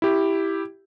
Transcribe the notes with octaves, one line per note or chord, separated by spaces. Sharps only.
E4 G4